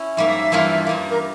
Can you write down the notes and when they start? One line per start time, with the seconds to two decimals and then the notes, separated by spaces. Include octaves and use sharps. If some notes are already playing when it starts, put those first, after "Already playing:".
Already playing: C#4 E4
0.16 G#2 G3 A#3 E5
0.52 G2 E3 G3 A#3 F4
0.87 G2 G3 A#3
1.11 A#4